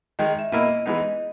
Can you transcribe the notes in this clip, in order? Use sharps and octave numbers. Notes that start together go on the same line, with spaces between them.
D#3 G#3 D#4
E5
B2 A#3 E4 D#5
E3 G#3 B3 D#4